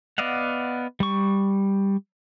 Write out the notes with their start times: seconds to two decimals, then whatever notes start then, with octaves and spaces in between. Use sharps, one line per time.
0.18 B3 D5 D#5 F5 F#5
1.00 G3 C#6